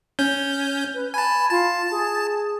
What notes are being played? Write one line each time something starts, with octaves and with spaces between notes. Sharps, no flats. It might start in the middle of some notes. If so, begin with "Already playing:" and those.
C#4 G6
B4
G#5 A5 B5
F4 A5
G#4